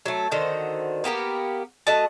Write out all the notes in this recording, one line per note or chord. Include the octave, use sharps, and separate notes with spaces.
F#3 A3
D3 D#3 F#4 C5
A#3 B3 G4 A#4
A3 F#4 D#5 A5